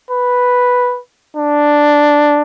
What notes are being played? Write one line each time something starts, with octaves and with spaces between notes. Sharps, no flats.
B4
D4